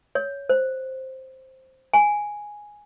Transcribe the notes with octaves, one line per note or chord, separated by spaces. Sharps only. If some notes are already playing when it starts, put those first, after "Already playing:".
C#5
C5
G#5